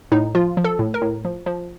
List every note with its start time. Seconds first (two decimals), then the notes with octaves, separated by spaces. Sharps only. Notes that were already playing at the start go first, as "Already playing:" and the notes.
0.12 A2 D#4
0.35 F3 F4
0.57 F3
0.64 A4
0.79 A2
0.94 A#4
1.02 A2
1.25 F3
1.46 F3